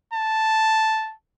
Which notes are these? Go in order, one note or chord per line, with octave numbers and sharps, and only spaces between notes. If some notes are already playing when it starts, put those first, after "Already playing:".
A5